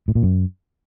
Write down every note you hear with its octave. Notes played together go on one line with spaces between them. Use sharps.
A2
A#2
F#2